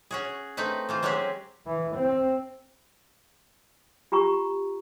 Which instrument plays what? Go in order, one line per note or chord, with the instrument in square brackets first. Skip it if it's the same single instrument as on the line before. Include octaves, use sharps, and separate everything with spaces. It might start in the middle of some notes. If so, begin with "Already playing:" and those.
[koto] C#4 F#4 G#4
A3 C4 D#4 B4
E3 F4 C5
F#3 G#3 C4 C#4 G4 G#4
[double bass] E3
C4
[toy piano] F4 G4 A#5 C#6